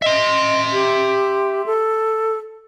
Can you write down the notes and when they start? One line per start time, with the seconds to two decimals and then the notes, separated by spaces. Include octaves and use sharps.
0.02 D#5 E5 C6
0.72 G4
1.66 A4